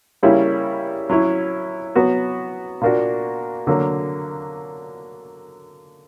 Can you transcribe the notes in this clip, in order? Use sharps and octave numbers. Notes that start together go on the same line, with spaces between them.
C#3 G3 A#3 C#4 E4
F#3 C#4 E4
F#3 B3 F#4
A#2 A#3 D4 F#4
D3 F#3 A#3